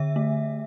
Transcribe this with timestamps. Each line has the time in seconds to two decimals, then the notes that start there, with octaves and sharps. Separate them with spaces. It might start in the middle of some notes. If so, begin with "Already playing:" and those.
Already playing: D3 E5
0.16 A3